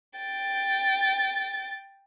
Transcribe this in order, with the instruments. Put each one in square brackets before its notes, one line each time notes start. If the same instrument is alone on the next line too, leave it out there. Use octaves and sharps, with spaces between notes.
[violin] G5 A6